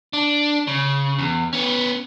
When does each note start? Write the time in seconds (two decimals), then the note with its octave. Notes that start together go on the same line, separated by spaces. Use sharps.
0.13 D4
0.67 C#3
1.19 E2
1.53 B3 C#4